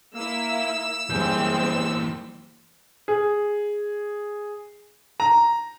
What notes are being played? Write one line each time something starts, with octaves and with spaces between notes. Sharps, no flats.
A#3 E4 E6
F#2 E3 G3 G#3 A#3 C4 G6
G#4
A#5